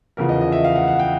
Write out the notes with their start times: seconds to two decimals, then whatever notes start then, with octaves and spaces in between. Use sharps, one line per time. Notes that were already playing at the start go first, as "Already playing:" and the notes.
0.17 E2 C#3 F3 A#4
0.29 D#5
0.41 D#5
0.52 E5
0.64 F5
0.75 F#5
0.88 F#5
0.99 G5